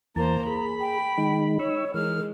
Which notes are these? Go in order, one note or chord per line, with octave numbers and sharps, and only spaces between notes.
E2 E3 A#3 C5 A5 A#5
G#4 B5
G5
D#3 G#3 D#4
D#4 C#5 C#6 E6
E3 G#3 A#4 F6